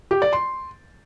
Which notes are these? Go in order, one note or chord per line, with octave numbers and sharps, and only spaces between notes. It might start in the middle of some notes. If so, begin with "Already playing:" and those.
G4
D5
C6